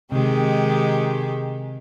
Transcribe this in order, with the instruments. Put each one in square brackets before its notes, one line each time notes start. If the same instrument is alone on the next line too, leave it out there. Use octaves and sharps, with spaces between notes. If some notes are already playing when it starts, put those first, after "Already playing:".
[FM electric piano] C3 [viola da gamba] D#3 G#3 G4